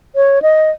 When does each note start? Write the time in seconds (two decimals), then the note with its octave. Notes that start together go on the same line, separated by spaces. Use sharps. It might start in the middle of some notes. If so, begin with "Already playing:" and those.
0.16 C#5
0.42 D#5